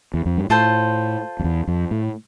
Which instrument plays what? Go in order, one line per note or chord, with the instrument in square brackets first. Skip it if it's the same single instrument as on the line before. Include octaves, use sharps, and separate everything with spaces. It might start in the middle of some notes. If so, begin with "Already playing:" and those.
[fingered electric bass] E2
F2
G2
[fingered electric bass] A2 [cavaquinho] F4 A4 C5
[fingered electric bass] F2
E2
F2
A2